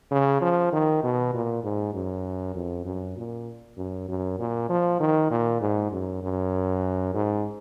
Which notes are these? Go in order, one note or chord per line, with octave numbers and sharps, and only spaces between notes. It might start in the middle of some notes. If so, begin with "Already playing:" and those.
C#3
F3
D#3
B2
A#2
G#2
F#2
F2
F#2
A#2
F#2
F#2
A#2
F3
D#3
A#2
G#2
F#2
F#2
G#2